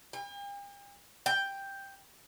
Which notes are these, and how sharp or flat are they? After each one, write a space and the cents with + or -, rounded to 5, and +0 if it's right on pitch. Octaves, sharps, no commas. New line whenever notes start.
G5 +45
G5 +5